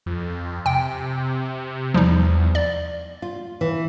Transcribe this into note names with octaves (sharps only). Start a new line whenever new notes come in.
F2
C3 G5
E2 F3 G3 D#4
D5
F4
E3